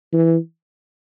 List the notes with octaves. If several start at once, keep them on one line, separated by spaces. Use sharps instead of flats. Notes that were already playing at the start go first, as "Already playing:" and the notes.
E3